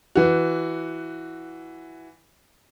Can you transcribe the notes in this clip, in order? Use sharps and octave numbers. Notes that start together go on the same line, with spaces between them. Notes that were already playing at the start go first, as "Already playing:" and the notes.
E3 F#4